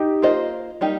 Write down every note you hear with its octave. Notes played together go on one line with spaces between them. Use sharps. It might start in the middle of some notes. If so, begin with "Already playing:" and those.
Already playing: D#4 G4
A#3 F4 C5 D#5
G3 A#3 D#4 G4